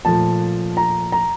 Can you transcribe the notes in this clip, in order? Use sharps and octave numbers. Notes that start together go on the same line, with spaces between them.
A#2 F3 A3 A5
A#5
A#5